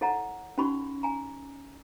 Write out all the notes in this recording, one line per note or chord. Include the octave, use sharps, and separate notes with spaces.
E4 A4 C#5 F#5 A#5
C#4 D#4 F#4 B5 C#6
G#5 A#5